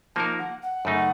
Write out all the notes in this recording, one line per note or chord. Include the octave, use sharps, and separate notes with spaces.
F3 A#3 D#4 A#4 A5
F#5
F#5
F#2 C#3 A3 D#4